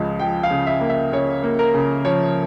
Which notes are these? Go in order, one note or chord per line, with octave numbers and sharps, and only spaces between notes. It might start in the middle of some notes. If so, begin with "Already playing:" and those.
Already playing: C#2 C#3 F3
F3 G5
F5
C#3
E5
A#3
E5
C#3 C#5
A#3
A#4
C#3
F3 C#5